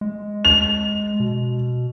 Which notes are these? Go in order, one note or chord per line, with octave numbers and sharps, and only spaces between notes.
G#3
F7
B2